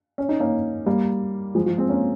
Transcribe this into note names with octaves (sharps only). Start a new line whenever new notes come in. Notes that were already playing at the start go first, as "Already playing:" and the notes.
C#4
D#4
A#3 C#4
G3 A#3
F3 G#3
F3
G#3 C4
A#3 C#4